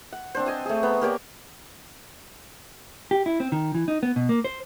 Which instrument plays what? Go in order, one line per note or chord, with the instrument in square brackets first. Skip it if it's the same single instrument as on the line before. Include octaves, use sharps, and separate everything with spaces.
[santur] F#5
C4 D4 C5
D#5 G#5 A5
A3 G#4
B3 A#5 B5
A#3 G4 C#5 D5
[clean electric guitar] G4
E4
C4
D#3
E3
D#4
B3
B2
A#3
C5